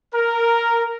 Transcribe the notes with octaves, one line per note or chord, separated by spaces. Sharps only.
A#4